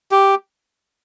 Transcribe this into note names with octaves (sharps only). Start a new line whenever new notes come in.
G4